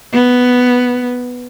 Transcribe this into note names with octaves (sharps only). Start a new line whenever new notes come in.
B3